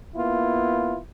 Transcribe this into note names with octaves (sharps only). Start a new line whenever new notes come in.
A#3 B3 E4 F4